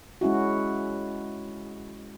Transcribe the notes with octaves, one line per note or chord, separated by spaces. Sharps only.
G#3 C#4 E4 F#4